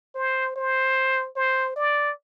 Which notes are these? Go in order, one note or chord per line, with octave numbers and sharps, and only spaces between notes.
C5
C5
C5
D5